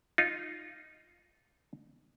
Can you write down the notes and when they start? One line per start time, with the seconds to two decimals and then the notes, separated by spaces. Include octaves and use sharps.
0.18 D#4 F4